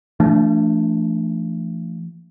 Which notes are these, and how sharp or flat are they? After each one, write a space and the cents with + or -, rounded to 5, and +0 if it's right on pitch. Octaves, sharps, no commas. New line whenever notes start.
F3 -45 A3 +15 D4 +0